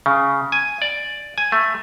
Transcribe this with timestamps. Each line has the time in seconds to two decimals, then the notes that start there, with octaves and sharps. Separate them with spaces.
0.06 C#3
0.52 G#5
0.82 D5
1.38 G#5
1.52 A3